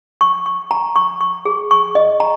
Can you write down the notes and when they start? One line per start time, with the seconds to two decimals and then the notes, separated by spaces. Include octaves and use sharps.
0.21 C#6
0.46 C#6
0.71 A#5
0.96 C#6
1.21 C#6
1.45 G#4
1.71 C#6
1.95 D#5
2.20 A#5